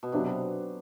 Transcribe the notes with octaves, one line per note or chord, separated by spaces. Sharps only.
B2
C3 F#3 B3 D4 G4 B4
B2